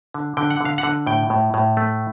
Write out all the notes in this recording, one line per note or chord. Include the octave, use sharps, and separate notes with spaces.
D3
D3 G5
F#5
D3 F5
F#5
D3
A2 G5
A2
A2
A3